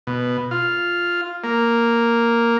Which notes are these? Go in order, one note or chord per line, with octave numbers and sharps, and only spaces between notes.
B2
F4
A#3